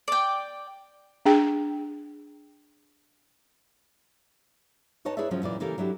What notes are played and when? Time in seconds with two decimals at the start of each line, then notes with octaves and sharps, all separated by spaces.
0.08 D5 G5
1.26 D4 G#4 G5
5.05 D#4 B4 C#5 D#5 A5
5.17 E4 G#4 B4 C#5 D5 E5
5.31 C#3 F3 F#3 C#4
5.42 F#2 A#2 E3 D5
5.60 C#3 E3 A#3 G4 A4 A#4
5.78 F#3 D4 E4 G4